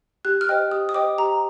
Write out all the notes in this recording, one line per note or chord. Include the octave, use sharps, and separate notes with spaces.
G4 F#6
F6
C5 D#5 G5
G4 D#6
D#6
C5 D#5 G5 D6
G4 A#5